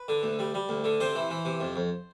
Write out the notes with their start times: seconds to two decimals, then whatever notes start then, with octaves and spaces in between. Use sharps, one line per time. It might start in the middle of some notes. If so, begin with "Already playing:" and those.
Already playing: B4
0.08 D3
0.23 D2
0.39 G3
0.54 G3
0.69 D2
0.84 D3
1.00 C3 C5
1.15 E3
1.30 E3
1.45 C3
1.60 F2
1.76 F2